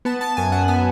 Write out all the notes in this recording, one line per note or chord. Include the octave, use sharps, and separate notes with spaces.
B3 A5
B3 A5
F#2 G#5
F#2 F#5
B3 G#5